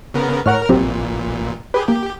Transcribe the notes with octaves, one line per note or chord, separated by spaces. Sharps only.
C#3 B3 A#4
A2 A#4 C#5 F#5 F6
A1 A#2 F#3 C4 G4
G4 G#4 B4
A#3 G4